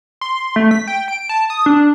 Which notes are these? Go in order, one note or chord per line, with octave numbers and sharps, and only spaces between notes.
C6
A3
B6
G5
D7
A5
D#6
D4